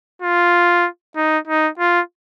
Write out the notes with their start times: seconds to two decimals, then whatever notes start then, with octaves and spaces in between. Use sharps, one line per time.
0.22 F4
1.16 D#4
1.47 D#4
1.79 F4